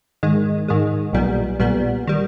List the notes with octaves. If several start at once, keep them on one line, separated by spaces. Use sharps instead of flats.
G#2 D#3 G#3
G#2 D#3 G#3
B1 A#2 G3 B3
B1 A#2 G3 B3
D#3 G3